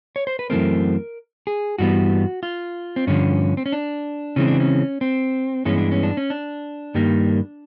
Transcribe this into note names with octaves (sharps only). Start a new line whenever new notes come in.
C#5
C5
B4
F#2 C#3 E3 A3 C4 A#4
G#4
G2 E3 G3 B3 F#4
F4
C4
G2 D3 F3 C#4
C4
C#4
D4
C#3 E3 G#3 C4 C#4
D4
C#4
C4
G2 E3 G#3 B3 C#4
D4
C#4
D4
C#4
D4
G2 D#3 G3 A#3